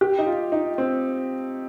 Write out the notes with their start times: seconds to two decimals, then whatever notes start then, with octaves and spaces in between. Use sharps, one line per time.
0.01 G4
0.18 D#4
0.27 F4
0.52 D#4
0.78 C4